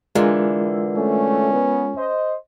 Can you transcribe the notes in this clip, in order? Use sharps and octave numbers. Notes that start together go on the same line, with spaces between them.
D3 E3 G#3 F4 A#4
A3 C#4
B3
C5 D#5